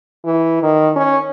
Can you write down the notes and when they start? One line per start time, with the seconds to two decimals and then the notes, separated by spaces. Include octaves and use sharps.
0.25 E3
0.63 D#3
0.96 C#4